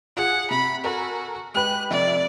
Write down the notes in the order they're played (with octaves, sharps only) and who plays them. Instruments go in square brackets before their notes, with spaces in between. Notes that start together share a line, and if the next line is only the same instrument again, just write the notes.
[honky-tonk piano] F4 G#4 [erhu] F#5
[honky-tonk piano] C3 [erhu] B5
[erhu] F#4 [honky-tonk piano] A4 A#4 G#5
[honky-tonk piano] G#3 G4 B4 [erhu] F#6
[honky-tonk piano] F1 F2 E5 [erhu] D5